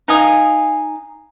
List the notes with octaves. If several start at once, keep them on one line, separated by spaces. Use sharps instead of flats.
D#4 F5 G#5 D#6